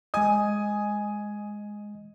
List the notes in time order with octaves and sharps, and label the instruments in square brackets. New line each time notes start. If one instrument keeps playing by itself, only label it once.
[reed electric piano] G#3 D#5 [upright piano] G#5 D#6